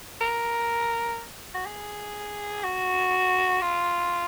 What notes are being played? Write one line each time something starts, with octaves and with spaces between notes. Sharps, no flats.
A#4
F#4
G#4
F#4
F4